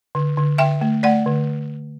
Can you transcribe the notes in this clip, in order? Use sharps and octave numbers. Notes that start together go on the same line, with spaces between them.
D3
D3
D3 E5 G5
A3
A3 D5 F#5
D3